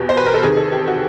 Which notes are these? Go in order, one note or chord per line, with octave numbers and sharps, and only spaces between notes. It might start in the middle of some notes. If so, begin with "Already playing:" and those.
Already playing: E2 B2 G4
C5
B4
A#4
A4
E2 C3 D#3 G#4
A4
G4
F#4